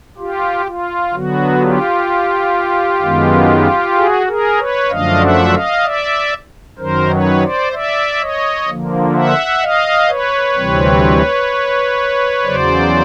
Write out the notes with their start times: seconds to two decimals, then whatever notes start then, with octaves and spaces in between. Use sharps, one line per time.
0.18 F4 G4
0.66 F4
1.13 D3 F#3 B3 F#4
1.59 F4 G4
3.02 F#2 D#3 G#3 B3
3.95 F#4 G#4
4.26 G#4 A#4
4.58 B4 C#5
4.89 F#2 D3 F3 A3 D4 D#5 F5
5.22 E5 F#5
5.52 D#5 F5
5.84 D5 E5
6.78 F#2 D#3 F#3 A#4 C5
7.10 B4 C#5
7.41 C5 D5
7.72 D5 E5
8.20 C#5 D#5
8.68 D3 F3 A#3
9.14 E5 F#5
9.61 D#5 F5
10.08 B4 C#5
10.56 D2 C3 E3 G3 C4
12.44 E2 C#3 F#3 C5 D5